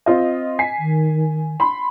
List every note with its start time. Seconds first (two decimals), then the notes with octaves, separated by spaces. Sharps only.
0.06 C4 F4 D#5
0.59 G#5 B6 C7
0.78 D#3
1.60 B5 C6